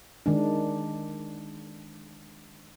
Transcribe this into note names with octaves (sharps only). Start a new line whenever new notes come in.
D#3 G#3 D4